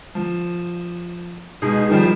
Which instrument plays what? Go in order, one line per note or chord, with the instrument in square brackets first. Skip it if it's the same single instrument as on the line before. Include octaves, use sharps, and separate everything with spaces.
[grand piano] F3
[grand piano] B2 G#3 [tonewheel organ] D#4 G#4
[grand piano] D#3 F3 G3